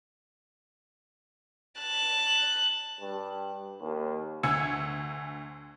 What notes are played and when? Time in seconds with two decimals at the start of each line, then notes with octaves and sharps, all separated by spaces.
1.81 A5 F#6
3.01 G2
3.81 D#2
4.43 D2 G#5 E6 G#6 C#7